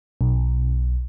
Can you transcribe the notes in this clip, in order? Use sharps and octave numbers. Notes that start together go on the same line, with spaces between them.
B1